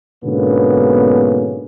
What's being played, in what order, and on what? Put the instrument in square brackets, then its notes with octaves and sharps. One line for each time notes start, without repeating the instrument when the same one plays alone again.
[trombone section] G#2 B2 D3 A#3 B3 C#4